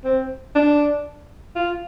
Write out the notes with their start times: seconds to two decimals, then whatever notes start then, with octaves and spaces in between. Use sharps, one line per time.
0.05 C4
0.55 D4
1.56 F4